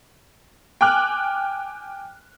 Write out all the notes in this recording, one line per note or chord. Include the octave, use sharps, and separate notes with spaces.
G5 G#5 D6 F6 F#6